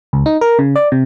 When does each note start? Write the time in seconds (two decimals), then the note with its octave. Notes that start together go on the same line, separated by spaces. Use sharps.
0.13 C#2
0.26 D#4
0.41 A#4
0.59 C#3
0.76 D5
0.92 C3